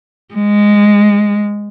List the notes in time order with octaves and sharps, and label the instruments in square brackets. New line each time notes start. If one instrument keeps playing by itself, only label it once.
[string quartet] G#3